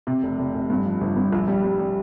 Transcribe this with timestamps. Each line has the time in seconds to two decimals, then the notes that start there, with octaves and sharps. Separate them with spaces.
0.07 C3
0.23 F1
0.39 F1
0.54 F1
0.70 G2
0.86 F3
1.01 G1
1.16 G2
1.33 A#1
1.48 G3
1.64 G3
1.79 G3